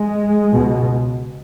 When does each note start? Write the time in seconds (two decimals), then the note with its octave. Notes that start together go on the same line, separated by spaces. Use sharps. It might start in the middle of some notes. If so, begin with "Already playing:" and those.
Already playing: G#3
0.52 C#2 B2